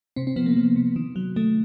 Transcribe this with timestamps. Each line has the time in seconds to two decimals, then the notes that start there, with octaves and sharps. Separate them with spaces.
0.16 C3 C4
0.27 C4
0.36 F3 B3
0.46 A#3
0.56 F3
0.76 C3
0.96 D#3
1.16 F#3
1.36 D#3 A3